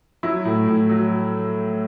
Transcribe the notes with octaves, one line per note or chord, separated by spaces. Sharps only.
F#3 E4
A2
A2
F#3